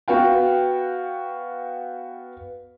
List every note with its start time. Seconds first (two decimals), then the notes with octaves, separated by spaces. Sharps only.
0.08 B3 F#4 B4 F5 G5